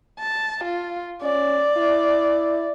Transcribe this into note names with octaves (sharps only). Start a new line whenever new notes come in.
A5
F4
C#4 D5
E4